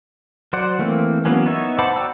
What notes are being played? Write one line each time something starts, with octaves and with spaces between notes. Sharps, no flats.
F#3 C5 D5 F#5
E3 A3 A#3 C4
E3 F#3 A#3 B3 C#4
B3 D#4 C#5 E5
C5 F#5 A5 B5 D6
F#4 D5 G5 A#5 E6